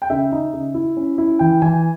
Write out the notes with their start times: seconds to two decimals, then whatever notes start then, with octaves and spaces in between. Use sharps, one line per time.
0.02 G5
0.10 C#3 E5
0.32 D#4
0.53 C#3
0.74 E4
0.97 C#4
1.18 E4
1.39 E3 G5
1.62 E3 G#5